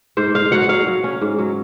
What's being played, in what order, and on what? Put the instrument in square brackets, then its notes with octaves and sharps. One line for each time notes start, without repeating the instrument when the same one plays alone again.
[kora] G#2 C5
G#2 F5
F#3 F#5
F#3 F5
F#3
C#4
G#2
F#3